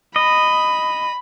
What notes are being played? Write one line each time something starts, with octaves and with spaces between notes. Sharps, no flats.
D#5 B5